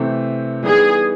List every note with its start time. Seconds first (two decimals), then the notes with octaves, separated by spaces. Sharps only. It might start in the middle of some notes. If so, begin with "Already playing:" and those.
Already playing: C3 E3 A3 C4
0.63 E3 G3 B3 D#4 G#4